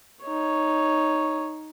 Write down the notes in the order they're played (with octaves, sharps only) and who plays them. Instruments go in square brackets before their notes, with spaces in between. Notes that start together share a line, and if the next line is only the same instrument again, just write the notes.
[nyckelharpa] D#4 C#5